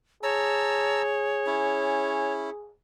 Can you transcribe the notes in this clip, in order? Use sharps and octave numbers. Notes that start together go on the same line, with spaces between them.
G#4 C#5 A5 A#5 E6
C#4 E4